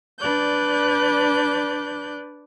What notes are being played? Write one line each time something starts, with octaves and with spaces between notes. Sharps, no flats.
D4 B4 D5 F#6 G6